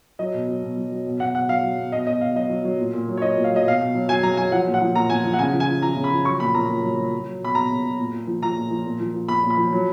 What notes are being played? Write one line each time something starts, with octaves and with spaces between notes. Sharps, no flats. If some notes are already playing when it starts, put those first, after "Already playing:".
F#3 D#5
B2
F#3
B2
F#3
F#3
B2
B2 F#5
B2 F#5
F#3 F5
F#3
B2
B2 D#5
B2 D#5
B2 F5
F#3 D#5
F#3
F#3
A#2
A#2
F#3
C#5
F#3 D#5
A#2
F5
F#3 D#5
B2 F5
B2
F#3
F#3 G#5
F#3 A#5
F#3 G#5
F3 F#5
A#2
F#5
F3
A#2 A#5
A#2 G#5
F3
F#5
C#3 G#5
F3
G#5
F3
F3 A#5
C#3
B5
F3
F#3 C#6
A#2 B5
A#2 A#5
A#2
F#3
F#3
F#3
F#3
B2 B5
B2 A#5
B2
F#3
A#2
A#2
F3
F3 A#5
A#2
F3
A#2
F3
F3
A#2 B5
A#2
B5
F3
F#3